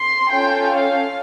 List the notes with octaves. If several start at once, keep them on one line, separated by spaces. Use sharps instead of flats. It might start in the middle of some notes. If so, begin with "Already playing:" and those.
Already playing: C6
C#4 F4 A4 G5
F5